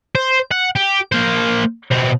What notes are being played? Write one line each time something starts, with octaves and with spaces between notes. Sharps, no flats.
C5
F#5
G4
A#3 C5
B2 C4